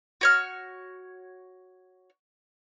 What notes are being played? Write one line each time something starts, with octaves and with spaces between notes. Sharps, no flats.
F#4 C#5 F6